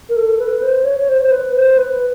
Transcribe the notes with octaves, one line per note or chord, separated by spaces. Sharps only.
A#4
A4
B4
B4
C5
C#5
C#5
C5
C5
B4
C5
B4